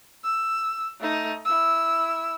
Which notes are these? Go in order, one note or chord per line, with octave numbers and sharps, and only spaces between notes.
E6
A3 D#4
E4 E6